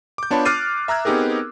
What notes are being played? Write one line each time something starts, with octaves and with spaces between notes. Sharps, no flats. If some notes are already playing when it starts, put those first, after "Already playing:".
D6 G6
B3 D4 F4 C#5 A5 B5
D6 F6 F#6 A6 C7 D#7
E5 A#5 E6 F#6 G#6
B3 C4 D#4 G4 G#4 A#4